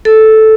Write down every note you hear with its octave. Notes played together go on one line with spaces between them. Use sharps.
A4